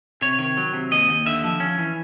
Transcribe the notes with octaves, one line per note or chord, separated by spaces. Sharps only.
C3 C#5
D#3
F#3
C3
D#2 D#5
D#2
D3 E5
F3
C#4
E3